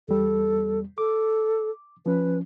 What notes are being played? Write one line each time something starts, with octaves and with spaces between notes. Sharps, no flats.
E2 G3 A4
A4 D6
F3 C#4 B4